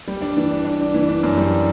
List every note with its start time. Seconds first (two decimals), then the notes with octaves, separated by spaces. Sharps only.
0.07 G3
0.22 D4
0.37 E3
0.51 D4
0.65 D4
0.80 D4
0.94 E3
1.09 D4
1.23 F#2
1.37 G3